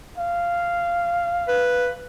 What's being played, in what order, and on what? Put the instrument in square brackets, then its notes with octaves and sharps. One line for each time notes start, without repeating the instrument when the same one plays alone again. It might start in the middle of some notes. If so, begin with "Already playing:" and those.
[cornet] F5
[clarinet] B4